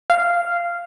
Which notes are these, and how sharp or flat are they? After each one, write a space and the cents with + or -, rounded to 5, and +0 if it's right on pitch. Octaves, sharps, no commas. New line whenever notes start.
F5 -10